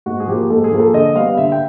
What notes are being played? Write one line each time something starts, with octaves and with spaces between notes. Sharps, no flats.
G#2 F#4
G#4
F3 A#3 G4
G#2 A4
G#4
F3 A#3
A4
D3 D#5
G3 B3 F5
D3 E5
G5